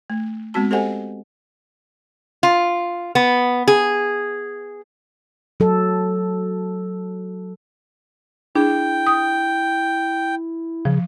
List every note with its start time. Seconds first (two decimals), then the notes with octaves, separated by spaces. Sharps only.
0.10 A3
0.54 G#3 B3 C4 F#4 A5
0.71 G4 A4 C5 D#5 F#5 G#5
2.43 F4
3.15 B3
3.68 G#4
5.60 F#3 A4
8.55 D4 E4 G#4 G5
9.07 D#6
10.85 C#3 F3